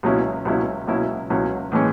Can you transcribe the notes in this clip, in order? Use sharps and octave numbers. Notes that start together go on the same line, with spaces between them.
C#2 B2 F#3 C#4 E4
C#2 B2 F#3 C#4 E4
C#2 B2 F#3 C#4 E4
C#2 B2 F#3 C#4 E4
A2 E3 G#3 C#4